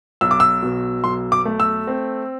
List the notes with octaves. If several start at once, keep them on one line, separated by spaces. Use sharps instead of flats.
B1 E6
D6
E6
B2
B1 C6
D6
A3
E6
C4